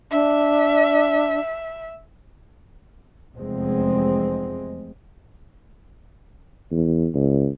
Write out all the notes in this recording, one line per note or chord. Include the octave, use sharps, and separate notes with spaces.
D4 E5
F1 E2 G#3 C4
E2
C#2